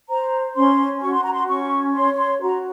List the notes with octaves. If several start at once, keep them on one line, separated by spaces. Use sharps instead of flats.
C5 A#5
C#4 C6
F#4 C#6
C6
A#5
C6
C#4 C#6
C#5 C6
C6
F#4 A#5